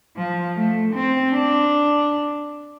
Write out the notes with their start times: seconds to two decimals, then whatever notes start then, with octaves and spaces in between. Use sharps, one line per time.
0.16 F3
0.56 A3
0.94 C4
1.34 D4